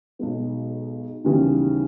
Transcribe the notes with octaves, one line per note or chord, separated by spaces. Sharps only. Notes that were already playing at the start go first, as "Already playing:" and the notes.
B1 B2 G#3 B3
D#2 C#3 E3 G3 B3